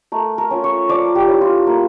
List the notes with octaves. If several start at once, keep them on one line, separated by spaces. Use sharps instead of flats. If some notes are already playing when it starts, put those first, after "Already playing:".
A3 A#4
A#4
C#4 F4
C#5
F3 D5
G4
C#4 E4
F4
A#3